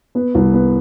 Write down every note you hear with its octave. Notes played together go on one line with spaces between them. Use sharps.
B3
C2
B3